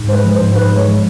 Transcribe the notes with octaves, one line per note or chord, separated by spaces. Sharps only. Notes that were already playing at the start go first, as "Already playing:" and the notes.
Already playing: G#2
G#3 B4 C5
F3
G#2 C5
G#2 B4
G#3 C#5
F3